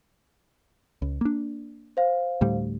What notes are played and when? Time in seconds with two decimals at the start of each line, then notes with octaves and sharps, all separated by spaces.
1.02 C#2
1.21 A#3 D4
1.97 C5 F5
2.41 D2 A2 G3